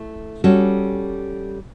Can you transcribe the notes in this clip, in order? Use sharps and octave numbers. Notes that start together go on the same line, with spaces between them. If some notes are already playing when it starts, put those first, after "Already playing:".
Already playing: A3 E4
G3 C#4 F#4 A4